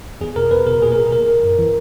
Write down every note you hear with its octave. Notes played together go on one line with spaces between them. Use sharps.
E2 G#4
B2 A#4
E2 B4
B2 A#4
A#2 G#4
A#4
A#2 A#4
F#2
E3